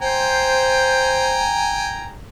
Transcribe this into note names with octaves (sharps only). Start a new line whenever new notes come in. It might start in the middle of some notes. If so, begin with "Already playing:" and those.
C5 G5 G#5 A#5